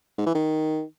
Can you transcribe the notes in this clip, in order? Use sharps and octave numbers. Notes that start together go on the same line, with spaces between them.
G#2
E3
D#3